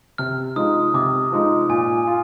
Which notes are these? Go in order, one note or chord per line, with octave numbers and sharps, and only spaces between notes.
C3 F6
F3 G#3 D#4 D#6
C3 D6
F3 G#3 D#4
A#2 G#5
F4